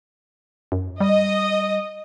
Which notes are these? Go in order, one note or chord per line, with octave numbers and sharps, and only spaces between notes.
F#2
G3 D#5